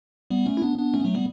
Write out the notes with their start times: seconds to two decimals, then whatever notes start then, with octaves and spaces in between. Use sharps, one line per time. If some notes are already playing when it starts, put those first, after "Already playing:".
0.30 G3 B3
0.46 A3 C#4
0.57 E4
0.62 B3 D4
0.78 B3 D4
0.93 A3 C#4
1.00 B3
1.04 F#3 A3
1.14 G3 B3